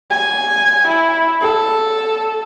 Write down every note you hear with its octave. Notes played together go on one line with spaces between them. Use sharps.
G#5
E4
A4